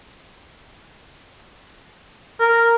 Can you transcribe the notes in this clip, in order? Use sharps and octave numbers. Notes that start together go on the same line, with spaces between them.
A#4